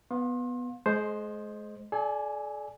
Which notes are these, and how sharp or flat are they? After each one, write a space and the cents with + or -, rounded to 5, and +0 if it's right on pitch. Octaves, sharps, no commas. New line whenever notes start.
B3 +0 F5 +35 C6 +30
G#3 +35 C5 +0 D#5 -5
A4 -40 D5 +0 G#5 +0